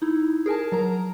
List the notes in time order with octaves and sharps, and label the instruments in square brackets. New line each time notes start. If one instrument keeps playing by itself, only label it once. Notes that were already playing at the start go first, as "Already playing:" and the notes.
[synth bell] D#4 E4
G#4 A#4 G#5 A5
F#3 A#4 A#5